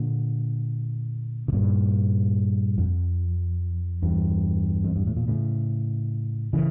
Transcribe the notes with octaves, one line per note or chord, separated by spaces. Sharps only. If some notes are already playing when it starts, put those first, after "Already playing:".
Already playing: A#2 D3
C#3
G2 A#2
F2
E2 G2
F2
G2
A2
A#2
A2 C#3
C#3 E3